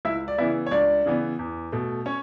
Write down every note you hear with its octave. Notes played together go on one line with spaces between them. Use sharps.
C#2 E4 E5
D5
C#3 E3 B3 E4 E5
C#5
C#2 D4 D5
C#3 E3 B3
E2
B2 A3
C#4 C#5